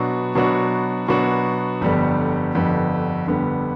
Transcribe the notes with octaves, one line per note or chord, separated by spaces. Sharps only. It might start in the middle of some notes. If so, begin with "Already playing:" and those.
Already playing: B2 F#3 B3 D4 F#4
B2 F#3 B3 D4 F#4
B2 F#3 B3 D4 F#4
G1 F2 D3 G3 B3
G1 F2 D3 G3 B3
G1 F2 D3 G3 B3